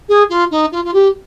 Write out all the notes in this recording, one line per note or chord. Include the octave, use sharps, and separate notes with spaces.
G#4
F4
D#4
F4
F4
G4